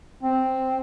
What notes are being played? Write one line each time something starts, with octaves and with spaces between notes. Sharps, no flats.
C4